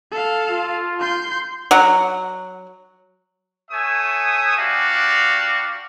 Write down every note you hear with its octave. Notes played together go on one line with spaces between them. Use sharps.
A4 F5
F4
C6 G6
F#3 F#5
A3 C#5 E5 G#5 D#6
G3 D4 F#4 G4 F5